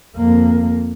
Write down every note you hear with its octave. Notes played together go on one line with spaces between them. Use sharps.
F2 A#3